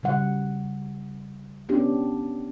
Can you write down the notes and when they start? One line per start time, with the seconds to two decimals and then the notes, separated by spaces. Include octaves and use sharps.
0.03 C#3 G3 F#5
1.69 B3 C#4 D4 G4